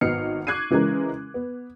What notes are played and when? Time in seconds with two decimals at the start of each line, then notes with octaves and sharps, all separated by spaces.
0.01 G#1 B3 D#5 F6 C7 C#7
0.47 C#6 D6 F#6 G#6 C7 D#7
0.70 C#3 E3 G#3 C#4 A#4
1.34 B3